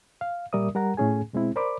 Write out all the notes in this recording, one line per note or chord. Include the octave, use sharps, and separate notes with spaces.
F5
A#2 G3 A#4 D5 E5 D#6
G3 A#4 F#5 A#5
A2 A3 C#4 G#4 G#5
B2 G#3 C4 E4
A#4 C5 D5 B5 D6